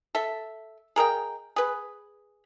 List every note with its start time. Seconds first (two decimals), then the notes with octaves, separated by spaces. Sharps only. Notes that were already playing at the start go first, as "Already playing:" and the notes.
0.15 A4 E5
0.96 G#4 A#4 D#5 G5
1.56 G#4 B4